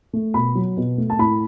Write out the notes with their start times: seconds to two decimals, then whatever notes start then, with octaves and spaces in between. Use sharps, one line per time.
0.13 A3
0.34 B2 B5
0.55 F#3
0.77 B2
0.98 A3
1.10 A5
1.19 A2 B5